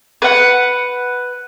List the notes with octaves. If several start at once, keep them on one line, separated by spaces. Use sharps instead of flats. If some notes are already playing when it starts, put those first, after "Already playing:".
B4 F#5